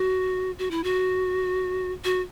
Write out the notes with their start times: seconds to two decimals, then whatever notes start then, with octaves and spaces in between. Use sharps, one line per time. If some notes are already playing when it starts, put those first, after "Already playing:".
Already playing: F#4
0.59 F#4
0.71 E4
0.84 F#4
2.04 F#4